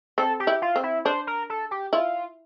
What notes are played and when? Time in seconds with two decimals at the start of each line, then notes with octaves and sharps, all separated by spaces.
0.18 C4 A4
0.40 G4
0.47 E4
0.62 F4
0.76 C4
0.83 E4
1.05 D4 C5
1.27 A#4
1.50 A4
1.71 G4
1.93 E4 F4